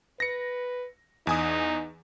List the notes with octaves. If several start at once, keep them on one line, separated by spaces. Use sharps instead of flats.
B4 A#6 C#7
E2 D#4 G#5 D#6